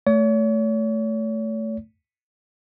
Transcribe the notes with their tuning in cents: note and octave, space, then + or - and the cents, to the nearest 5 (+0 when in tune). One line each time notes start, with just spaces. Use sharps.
A3 +0 C#5 +40